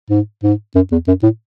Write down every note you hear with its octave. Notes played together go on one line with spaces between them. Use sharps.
G#2
G#2
F#2
E2
F#2
A2